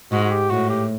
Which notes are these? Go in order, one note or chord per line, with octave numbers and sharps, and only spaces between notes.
G#2 F#4
F#4
G4
A2 F#4
G4